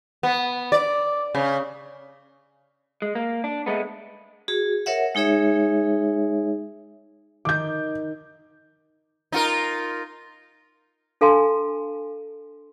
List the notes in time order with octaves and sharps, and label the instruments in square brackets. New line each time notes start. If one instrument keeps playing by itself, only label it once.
[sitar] B3
D5
C#3
[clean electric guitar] G#3
A#3
D4
G#3 A3 B3
[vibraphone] F#4 G#4
A#4 C#5 E5 F#5
G#3 D#4 G#4 C#5 E5
[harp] D#3 [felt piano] D6 G6
[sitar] D#4 F4 A#4
[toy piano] D4 A4 F5 G#5 A5 C6